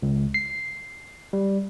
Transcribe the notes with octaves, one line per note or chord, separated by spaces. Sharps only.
C#2
C7
G3